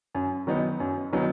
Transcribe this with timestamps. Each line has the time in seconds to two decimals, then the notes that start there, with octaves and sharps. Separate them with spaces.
0.15 F#2
0.47 D#3 F#3 B3 D#4
0.80 F#2
1.12 D#3 F#3 B3 D#4